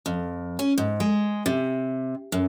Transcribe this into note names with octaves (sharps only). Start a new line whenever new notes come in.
F2
C#4
G#2
G#3
C3
F#2